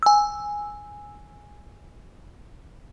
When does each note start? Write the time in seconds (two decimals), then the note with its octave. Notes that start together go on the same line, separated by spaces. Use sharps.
0.03 G#5 E6